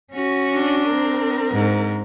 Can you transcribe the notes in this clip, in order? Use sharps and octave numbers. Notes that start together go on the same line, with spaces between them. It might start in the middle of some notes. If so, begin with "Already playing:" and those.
C#4 F#4
D4
C4 A#4
G#2